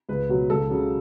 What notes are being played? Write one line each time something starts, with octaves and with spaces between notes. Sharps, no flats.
C#2 B4
B2 F#3
C#2 A4
C#3 F#3